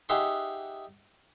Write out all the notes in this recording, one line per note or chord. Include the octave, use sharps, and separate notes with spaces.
D#4 G4 G#4 E5 F#5 C6